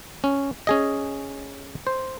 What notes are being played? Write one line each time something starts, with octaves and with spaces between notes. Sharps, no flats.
C#4
C#4 G#4 D#5
C5